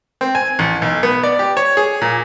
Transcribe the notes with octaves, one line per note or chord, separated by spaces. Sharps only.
C4
G#5
A1
B1
B3
D5
G4
C#5
G#4
A#2